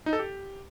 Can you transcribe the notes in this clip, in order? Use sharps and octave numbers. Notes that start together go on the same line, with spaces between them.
D#4
A4
G4